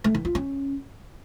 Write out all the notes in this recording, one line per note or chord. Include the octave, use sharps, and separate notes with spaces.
A3
E3
F4
C#4